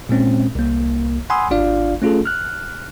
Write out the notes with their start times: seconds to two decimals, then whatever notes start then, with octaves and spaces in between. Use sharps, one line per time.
0.09 A#2 G#3 C4 C#4
0.55 C2 A#3
1.30 F#5 G#5 B5 C6 D#6 E6
1.51 G#1 D4 F4 D5 F5
2.02 A3 C#4 F4 G#4 A4
2.25 F6 F#6